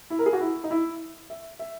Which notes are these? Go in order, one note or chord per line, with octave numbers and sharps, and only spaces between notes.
E4
A#4
G#4
F#4
E4
D#4
E4
E5
E5